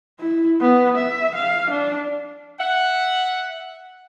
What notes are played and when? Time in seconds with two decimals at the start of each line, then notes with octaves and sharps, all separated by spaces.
0.20 E4
0.61 B3
0.97 E5
1.35 F5
1.70 D4
2.60 E5 F#5